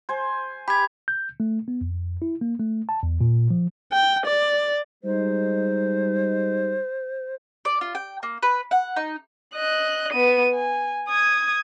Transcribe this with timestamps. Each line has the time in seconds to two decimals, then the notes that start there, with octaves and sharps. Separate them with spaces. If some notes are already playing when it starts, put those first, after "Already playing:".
0.09 C5 G#5
0.68 G4 B5 G#6
1.08 G6
1.40 A3
1.68 B3
1.81 F2
2.22 E4
2.41 A#3
2.60 A3
2.89 A5
3.03 E2
3.21 A#2
3.50 F3
3.92 G5
4.26 D5
5.04 G3 G#3 D#4 C5
7.65 D5
7.81 F4
7.95 G5
8.23 A#3
8.43 B4
8.71 F#5
8.96 D#4
9.55 D#5 F#6
10.13 B3 D#7
10.53 G#5
11.09 D#6 G#6